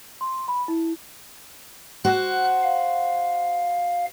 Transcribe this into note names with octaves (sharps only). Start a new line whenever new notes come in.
C6
B5
E4
F#4 C5 F#6
F5